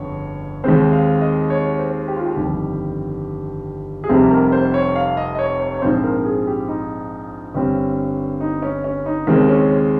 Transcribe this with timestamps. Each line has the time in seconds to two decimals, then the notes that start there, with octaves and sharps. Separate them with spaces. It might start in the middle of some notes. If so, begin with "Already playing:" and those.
Already playing: G1 F2 C#3 C#5
0.64 D#2 D#3 G#3 C4 C5
0.93 F5
1.21 D#5
1.50 C#5
1.79 C5
2.08 G4
2.16 F4
2.25 G4
2.37 G1 F2 D#3 G3
4.04 G#4
4.09 F1 F2 C3 G3 C4 G4
4.31 A#4
4.52 C5
4.74 C#5
4.96 F5
5.17 D#5
5.35 D#5
5.39 C#5
5.60 C#5
5.74 C#5
5.82 A#1 G#2 F3 C4 C5
6.04 A#4
6.25 G#4
6.47 G4
6.68 D#4
7.54 G1 G2 G3 C4 C#4
8.40 D#4
8.62 C#4
8.84 C#4
9.06 D#4
9.27 D#2 C#3 G#3 C4 A#4
9.49 C#4